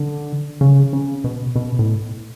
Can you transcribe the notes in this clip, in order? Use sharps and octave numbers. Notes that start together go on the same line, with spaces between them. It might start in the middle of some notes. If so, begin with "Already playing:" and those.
Already playing: D3
C#3
C#3
B2
B2
A2